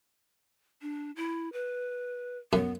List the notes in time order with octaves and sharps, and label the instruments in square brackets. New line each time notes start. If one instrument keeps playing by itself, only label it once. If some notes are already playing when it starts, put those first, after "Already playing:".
[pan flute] D4
E4
B4
[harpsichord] F#2 [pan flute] B3